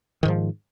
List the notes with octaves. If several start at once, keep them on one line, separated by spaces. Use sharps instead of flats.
G#2 D#3 F3